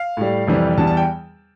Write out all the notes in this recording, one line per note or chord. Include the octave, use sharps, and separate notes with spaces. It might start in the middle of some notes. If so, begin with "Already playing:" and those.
Already playing: F5
A2 G3
F2 C3 E3 G3
E2 E3 G3 A5
A5
G5